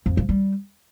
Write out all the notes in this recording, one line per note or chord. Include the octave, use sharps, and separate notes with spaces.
F2
F3
G3